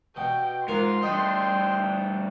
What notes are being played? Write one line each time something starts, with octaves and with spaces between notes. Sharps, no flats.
B2 G5
G#2 F4 A#4 F5 C6
G2 A3 D#5 G5 B5